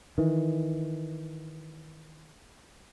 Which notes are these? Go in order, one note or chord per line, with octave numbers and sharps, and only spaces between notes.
D#3 E3